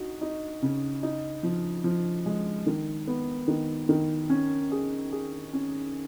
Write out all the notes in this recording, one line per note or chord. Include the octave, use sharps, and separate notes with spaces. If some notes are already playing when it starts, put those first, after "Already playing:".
Already playing: D#4 F#4
D#4
C#3
D#4
F3
F3
G#3
D#3
B3
D#3
D#3
C#4
G#4
G#4
C#4